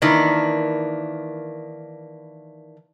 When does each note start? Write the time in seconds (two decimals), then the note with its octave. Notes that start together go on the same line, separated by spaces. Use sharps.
0.02 D#3 E3 A#3 D4